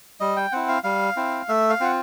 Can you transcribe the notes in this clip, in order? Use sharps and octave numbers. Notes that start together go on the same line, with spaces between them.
G3 D#5
G5
C4 E4 F#5
F5
G3 F5
C4 E4
A3 E5
F5
C4 F4 F#5